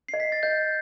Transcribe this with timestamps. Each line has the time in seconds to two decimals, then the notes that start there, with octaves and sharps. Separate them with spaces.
0.09 C7
0.14 D#5
0.20 B6
0.32 A6
0.43 D#5 G6